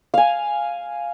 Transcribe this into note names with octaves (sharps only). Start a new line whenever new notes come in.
F5 G#5